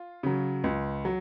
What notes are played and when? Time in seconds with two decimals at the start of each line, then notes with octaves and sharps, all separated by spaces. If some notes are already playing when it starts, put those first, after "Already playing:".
Already playing: F4
0.23 C#3 F#3
0.64 C#2
1.05 F#3